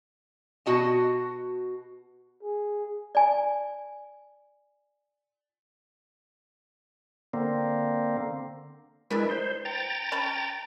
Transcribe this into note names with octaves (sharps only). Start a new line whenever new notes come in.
B2 F#4 D#5 A5
G#4
D5 G#5
D3 A#3 C4
G#3 D4 E4 A#4 B4
C5
G5 A#5 A6
C#4 A5 B5